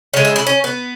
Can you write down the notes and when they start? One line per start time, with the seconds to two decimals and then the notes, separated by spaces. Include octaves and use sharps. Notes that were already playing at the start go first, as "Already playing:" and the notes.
0.13 C#3 C#5
0.17 G#3
0.25 E5
0.36 E4
0.47 C#4
0.64 B3